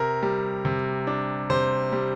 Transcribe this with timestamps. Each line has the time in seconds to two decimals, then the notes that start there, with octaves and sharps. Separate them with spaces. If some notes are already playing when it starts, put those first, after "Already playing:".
Already playing: C3 A#4
0.23 G3
0.65 C3
1.07 D4
1.50 C3 C5
1.92 G3